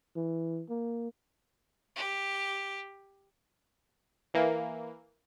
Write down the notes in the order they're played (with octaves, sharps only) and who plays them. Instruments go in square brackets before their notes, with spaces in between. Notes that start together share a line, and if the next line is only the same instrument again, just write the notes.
[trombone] E3
A#3
[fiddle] G4
[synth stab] E3 A#3